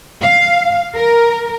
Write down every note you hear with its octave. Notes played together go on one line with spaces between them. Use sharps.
F5
A#4